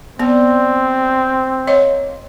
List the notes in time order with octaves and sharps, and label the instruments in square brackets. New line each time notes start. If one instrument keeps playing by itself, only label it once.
[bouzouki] G3 [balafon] B3 [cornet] C4
[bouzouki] A#3 [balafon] C#5 D#5